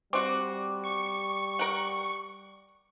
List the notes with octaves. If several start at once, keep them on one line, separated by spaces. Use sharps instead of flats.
G3 C4 F#4 D6
C#6
A#4 F#5